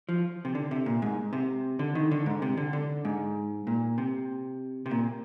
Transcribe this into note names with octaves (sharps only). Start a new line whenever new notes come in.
F3
C3
D3
C3
A#2
G#2
C3
D3
D#3
D3
G#2
C3
D3
D3
G#2
A#2
C3
C3
A#2